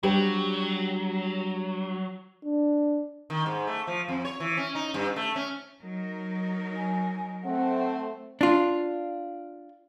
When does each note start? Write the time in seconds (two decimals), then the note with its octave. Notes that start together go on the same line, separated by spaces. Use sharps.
0.03 F#3 G3 D4 G4 C5 G5
2.44 D4
3.30 D#3
3.46 G#2
3.67 A3
3.87 F3
4.08 F2
4.25 C#5
4.40 E3
4.57 C#4
4.75 D#4
4.94 G2
5.16 A3
5.36 C#4
5.81 F#3 D#4 A#4
6.77 G#5
7.44 A3 C4 F#5
8.41 D4 F4